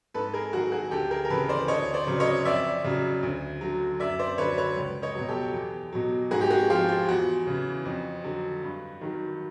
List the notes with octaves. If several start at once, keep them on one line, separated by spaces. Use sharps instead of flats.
G#2 A4 B4
G#4 A#4
D#3 F#3 F#4 G#4
F#4 G#4
D2 G4 A4
G#4 A#4
A#4
C#3 E3 A4 B4
C5 D5
D2 C#5 D#5
C5 D5
C#3 F#3
C#5 D#5
F2 D5 E5
C#3 F#3
D2
D3 F#3
F#2 D5 E5
C5 D5
D3 F#3 B4 C#5
B4 C#5
C#2
C#5 D#5
B2 F#3
G4 A4
E2
B2 F#3
G#2 F#4 G#4
G4
F#4 G#4
F3 F4 G4
F4
E2 F#4
C#3 E3
F2
D3 F#3
G2
D#3 F#3